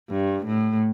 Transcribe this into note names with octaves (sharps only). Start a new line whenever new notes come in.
G2
A2